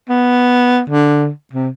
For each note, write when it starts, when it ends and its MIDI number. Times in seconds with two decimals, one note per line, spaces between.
0.09 0.80 59
0.90 1.28 50
1.53 1.68 48